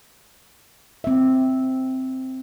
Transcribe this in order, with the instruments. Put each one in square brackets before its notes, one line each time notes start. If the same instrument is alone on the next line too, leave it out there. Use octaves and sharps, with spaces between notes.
[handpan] C4 E5